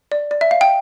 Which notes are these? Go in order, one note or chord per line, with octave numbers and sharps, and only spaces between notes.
D5
D5
E5
F5
G5